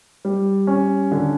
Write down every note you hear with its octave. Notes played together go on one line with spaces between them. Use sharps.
G3
C#4
D3